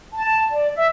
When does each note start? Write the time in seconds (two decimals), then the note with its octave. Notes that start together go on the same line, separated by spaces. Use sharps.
0.13 A5
0.51 D5
0.75 E5